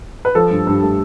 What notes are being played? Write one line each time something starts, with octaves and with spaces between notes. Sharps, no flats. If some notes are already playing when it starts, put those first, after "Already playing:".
B4
F3 A4
G2
G2
A3